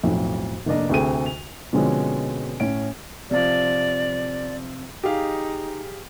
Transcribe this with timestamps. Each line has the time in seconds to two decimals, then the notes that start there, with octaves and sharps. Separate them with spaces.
0.03 B1 F2 A2
0.66 F1 A#3 D4 D#5
0.89 D2 C3 G#4 A4 G5 D#7
1.26 F7
1.73 B2 D3 F3 G#3 C4 C#4
2.60 A2 C#4 D7
3.31 C3 F3 D5
5.04 D#4 G4 G#4 F5